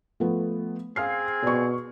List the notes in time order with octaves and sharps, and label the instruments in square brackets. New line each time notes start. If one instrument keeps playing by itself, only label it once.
[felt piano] F3 A3 B3
[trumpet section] C4 G#4 [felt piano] F5 F6 C7
[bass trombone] B2 [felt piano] D5 C#6